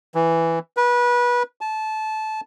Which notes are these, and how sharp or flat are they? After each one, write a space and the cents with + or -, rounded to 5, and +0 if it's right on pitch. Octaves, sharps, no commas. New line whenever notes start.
E3 +5
B4 -25
A5 -20